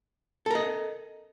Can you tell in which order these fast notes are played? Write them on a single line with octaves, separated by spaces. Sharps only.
A4 A#4 D#5